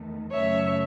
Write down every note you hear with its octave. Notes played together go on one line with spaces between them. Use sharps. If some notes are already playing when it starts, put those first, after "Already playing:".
Already playing: E2 D#3 A3
F#2 C#3 F#3 A3 C#5 E5